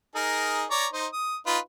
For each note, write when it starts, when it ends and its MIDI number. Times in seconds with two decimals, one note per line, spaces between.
0.15 0.65 63
0.15 0.65 68
0.15 0.65 70
0.71 0.86 73
0.71 0.86 74
0.71 0.86 82
0.93 1.07 63
0.93 1.07 72
1.13 1.37 87
1.46 1.58 63
1.46 1.58 65
1.46 1.58 71